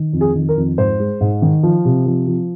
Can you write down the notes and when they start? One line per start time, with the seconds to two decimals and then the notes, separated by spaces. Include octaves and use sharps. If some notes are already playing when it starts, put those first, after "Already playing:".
Already playing: D#3
0.13 F2
0.21 G#4
0.35 D#3
0.49 A#4
0.57 F2
0.78 G#2 C5
1.00 G#3
1.21 G#2
1.42 D#3
1.63 F3
1.85 C3
2.06 F3
2.28 F3